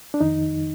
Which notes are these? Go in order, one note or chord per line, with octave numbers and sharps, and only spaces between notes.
D4
F2 D#3 D#4